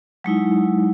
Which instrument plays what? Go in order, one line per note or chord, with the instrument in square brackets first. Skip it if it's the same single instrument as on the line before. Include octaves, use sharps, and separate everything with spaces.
[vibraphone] F#3 G#3 D#4 E4